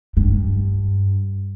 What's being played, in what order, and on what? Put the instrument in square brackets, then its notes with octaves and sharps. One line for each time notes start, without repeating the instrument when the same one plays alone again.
[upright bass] G2